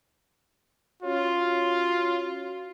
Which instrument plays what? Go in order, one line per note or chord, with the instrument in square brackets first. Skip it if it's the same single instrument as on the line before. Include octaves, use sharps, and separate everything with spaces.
[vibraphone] C#4 F#4 C#5 [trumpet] F4